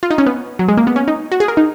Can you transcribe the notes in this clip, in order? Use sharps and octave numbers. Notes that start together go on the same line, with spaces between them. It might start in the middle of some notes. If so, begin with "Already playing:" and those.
F4
D#4
C#4
B3
F#3
G#3
A#3
B3
C#4
D#4
F#4
G#4
A#4
D#4